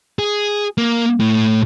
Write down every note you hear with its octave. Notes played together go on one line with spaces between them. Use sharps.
G#4
A#3
A2